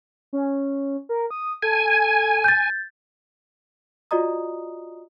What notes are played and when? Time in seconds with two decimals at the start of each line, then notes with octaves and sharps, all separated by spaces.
0.33 C#4
1.09 A#4
1.31 D#6
1.62 A4 G#5
2.44 G6 A6
4.11 F4 F#4 D5 D#5 A#5 D#6